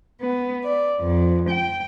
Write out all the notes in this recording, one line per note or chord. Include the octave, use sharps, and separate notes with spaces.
B3
D5
F2
G5